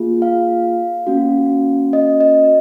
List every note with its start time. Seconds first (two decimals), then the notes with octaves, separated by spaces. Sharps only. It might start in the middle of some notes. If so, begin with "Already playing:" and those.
Already playing: A#3 F4 G#4
0.22 F5
1.07 A#3 C#4 F#4
1.93 D#5
2.20 D#5